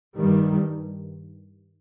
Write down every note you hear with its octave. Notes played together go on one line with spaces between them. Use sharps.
G2 D#3 G3